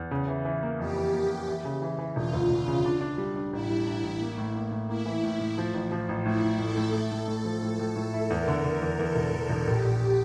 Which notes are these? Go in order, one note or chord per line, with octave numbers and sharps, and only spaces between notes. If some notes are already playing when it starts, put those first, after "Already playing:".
Already playing: E2
C#3
E3
E3
A#3
F2 G4
E3
A#3
A#3
E3
C#3
E3
E3
E1 F4
D2
E1
C#3
D4
D4
G3
D4
A1 E4
G3
D4
A1
A#3
A2
A#3
A2
A#3 E4
E3
A2
A2
F3
A1
F3
A1
A2 E4
A2
A2 A4
A2
A3
A2
A2
F3
A2
A2
A2
E4
E2 A#4
D3
D3
E2
E2 A4
E1
E1
E1
A#1 G4
A#1